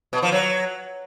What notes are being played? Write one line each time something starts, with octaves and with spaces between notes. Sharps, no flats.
B2
F3
F#3